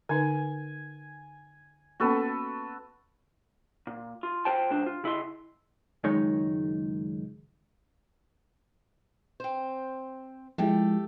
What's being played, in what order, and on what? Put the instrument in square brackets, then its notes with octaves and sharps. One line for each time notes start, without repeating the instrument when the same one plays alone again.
[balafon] D3 D#4 B4 [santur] G#5
[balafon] A#3 B3 C#4 [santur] F#4 A4 B4
[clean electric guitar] A#2
F4
F4 C5 G5 A5
C#2 D4 C5
F4
C#3 E4 D#5 C6
[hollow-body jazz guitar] C#2 F#2 D#3 G#3 D#4 C#5
[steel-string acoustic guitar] C4 C5
[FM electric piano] F3 G#3 E4 [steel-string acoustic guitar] A3 G4 A4